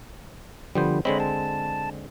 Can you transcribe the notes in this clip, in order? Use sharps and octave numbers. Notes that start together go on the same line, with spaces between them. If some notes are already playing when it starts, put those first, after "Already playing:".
D3 F3 G3 B3 C5
D3 G#3 C4 C#5 D#5 B5
A5